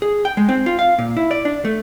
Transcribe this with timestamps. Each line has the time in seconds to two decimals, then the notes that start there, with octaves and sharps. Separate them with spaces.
0.02 G#4
0.25 G5
0.37 G#3
0.49 C4
0.66 F4
0.79 F5
0.99 A#2
1.17 E4
1.31 D5
1.45 D4
1.65 A3